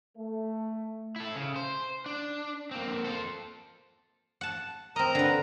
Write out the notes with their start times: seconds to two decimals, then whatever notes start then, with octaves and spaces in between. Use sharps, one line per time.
0.17 A3
1.16 E4 A4
1.35 C#3
1.56 C5
2.06 D4
2.71 A#3 C4
3.04 A4 C5
4.41 F#5 A5
4.96 C4 A#4 D#5 A#5
5.15 D3 B4